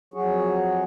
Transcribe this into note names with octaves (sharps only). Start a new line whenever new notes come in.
F2 F#3 F#4 G#4 C#5